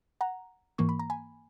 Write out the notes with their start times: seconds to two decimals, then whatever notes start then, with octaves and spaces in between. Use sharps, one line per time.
0.21 F#5 A#5
0.78 G#2 E3 A#3 C#6
0.89 B5
0.99 A#5
1.10 G#5 B5